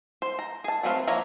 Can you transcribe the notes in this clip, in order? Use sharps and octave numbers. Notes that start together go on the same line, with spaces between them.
C5
A#5
G#4 A5
F#3 A3 C4 B4 F5
F3 A#3 C#5 E5 A#5